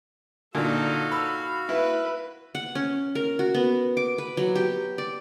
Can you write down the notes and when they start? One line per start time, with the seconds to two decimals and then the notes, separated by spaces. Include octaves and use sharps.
0.55 A#2 D3 D#4 F#4 A4 F5
1.11 B5 E6
1.69 E4 B4
2.55 F#5
2.75 C#4
3.15 A#4
3.39 F#4
3.54 B3
3.97 D6
4.18 B4
4.37 F#3
4.55 G4
4.98 D5